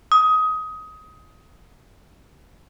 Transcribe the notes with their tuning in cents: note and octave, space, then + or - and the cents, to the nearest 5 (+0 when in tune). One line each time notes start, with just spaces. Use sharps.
D#6 +20